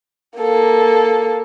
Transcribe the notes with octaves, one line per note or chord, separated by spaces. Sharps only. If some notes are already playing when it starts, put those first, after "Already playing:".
A#3 A4